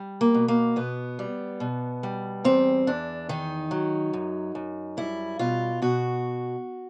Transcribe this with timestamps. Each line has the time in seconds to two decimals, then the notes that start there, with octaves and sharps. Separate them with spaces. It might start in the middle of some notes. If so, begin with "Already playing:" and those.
Already playing: G3
0.21 A#3
0.34 B2
0.48 A#3
0.76 B2 B3
1.19 G3
1.60 B2
2.03 G3
2.44 E2 C4
2.87 E2 D4
3.29 D#3 D#4
3.71 F#3
4.13 F#2
4.55 F#2
4.97 G3 E4
5.39 B2 F4
5.82 B2 F#4